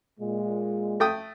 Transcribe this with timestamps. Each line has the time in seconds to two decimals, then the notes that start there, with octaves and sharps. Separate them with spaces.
0.20 A#2 G#3
1.00 A3 G5 D#6